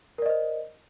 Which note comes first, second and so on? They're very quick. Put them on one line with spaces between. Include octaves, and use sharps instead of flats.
A#4 D5 D#5 C5